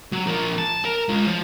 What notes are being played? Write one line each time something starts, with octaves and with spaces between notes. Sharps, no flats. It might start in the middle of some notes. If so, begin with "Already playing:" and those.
F#3
F3 A#4
A5
A#4
G#3 F4
F3